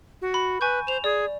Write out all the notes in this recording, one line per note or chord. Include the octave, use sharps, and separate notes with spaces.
F#4
B5
B4 G#5 C#6 G6
C5 E7 F7
G#4 D5